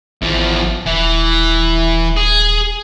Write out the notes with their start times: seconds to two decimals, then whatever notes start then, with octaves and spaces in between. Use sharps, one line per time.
0.22 G#1 E2 F3
0.86 D#1 E3
2.17 G#4